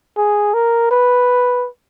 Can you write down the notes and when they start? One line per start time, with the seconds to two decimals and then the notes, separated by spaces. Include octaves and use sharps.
0.17 G#4
0.54 A#4
0.91 B4